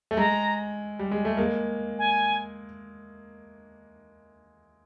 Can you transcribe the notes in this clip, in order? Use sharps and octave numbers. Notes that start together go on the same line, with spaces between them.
A3
G#3 A#5
G3
G#3
A3
G#3 A#3
G#5